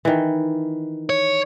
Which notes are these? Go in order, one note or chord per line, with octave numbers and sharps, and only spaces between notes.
D#3 E3
C#5